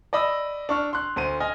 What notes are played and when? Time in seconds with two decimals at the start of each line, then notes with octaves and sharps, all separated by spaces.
0.13 D5 D#5 B5 D#6 E6
0.69 D4 C#6 F6
0.93 C6 F#6
1.16 D2 C5 D#7
1.40 D#5 G#5 F6